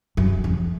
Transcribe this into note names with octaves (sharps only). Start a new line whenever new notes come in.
F#2
F2